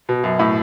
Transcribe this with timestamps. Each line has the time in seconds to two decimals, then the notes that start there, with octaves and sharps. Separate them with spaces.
0.09 B2
0.24 F#2
0.39 A2